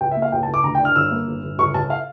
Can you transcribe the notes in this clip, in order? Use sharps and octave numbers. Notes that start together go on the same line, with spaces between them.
C#2 G5
E5
A#3
F5
C#2 G5
A5
C#2
D6
D2 A#5
G5
D4
F6
G1 E6
A#3
G1
G1
C#2 C#6
C#2 A5
F5